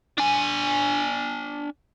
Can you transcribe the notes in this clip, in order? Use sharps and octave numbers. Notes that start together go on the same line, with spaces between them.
D4 G#5